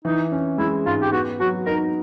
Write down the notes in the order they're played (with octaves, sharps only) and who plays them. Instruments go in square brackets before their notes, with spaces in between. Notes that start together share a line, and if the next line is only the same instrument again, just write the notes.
[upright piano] E3 [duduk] D#4
[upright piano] C#4
[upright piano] G#3 [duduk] E4
[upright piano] G#2 [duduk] F4
[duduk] G4
[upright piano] B3 [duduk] F#4
[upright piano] F#3 [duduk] F#4
[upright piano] D#4 [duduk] A#4